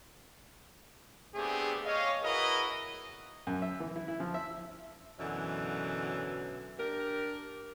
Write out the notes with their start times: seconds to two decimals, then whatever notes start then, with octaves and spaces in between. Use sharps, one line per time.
1.35 A3 B3 C4 D4 G4 G#4
1.85 C#5 D#5 F5
2.23 E4 F#4 G#4 A#4 B4 D#5
3.47 F#2
3.62 E5
3.80 E3
3.96 E4
4.08 E4
4.20 F3
4.34 E5
5.19 F#2 B2 D3 E3 F#3
6.79 D4 G4 A#4